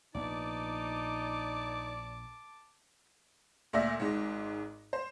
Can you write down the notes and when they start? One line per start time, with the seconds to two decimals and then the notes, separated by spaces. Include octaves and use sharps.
0.15 A#1 B3 D#4 D5 A5 D6
3.73 D2 A#2 D5 E5 A#6
4.00 G#1 G#2
4.93 C5